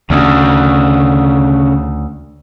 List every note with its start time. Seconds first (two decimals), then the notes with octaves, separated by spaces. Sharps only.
0.10 D2 C#3 D4